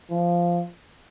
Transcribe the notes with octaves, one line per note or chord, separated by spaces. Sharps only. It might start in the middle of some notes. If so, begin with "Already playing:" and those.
F3